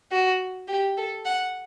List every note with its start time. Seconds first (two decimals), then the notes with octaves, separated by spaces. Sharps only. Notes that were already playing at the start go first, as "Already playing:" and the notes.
0.11 F#4
0.68 G4
0.97 A4
1.25 F#5